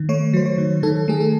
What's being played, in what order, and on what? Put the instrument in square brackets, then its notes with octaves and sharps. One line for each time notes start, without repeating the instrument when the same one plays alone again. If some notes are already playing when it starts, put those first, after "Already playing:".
Already playing: [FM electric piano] D#3
A3 C#5
F#3 C5
C#5
D#3
D#3 A4
A3 G#4
A4